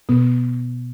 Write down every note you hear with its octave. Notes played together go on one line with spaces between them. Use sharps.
B2 B3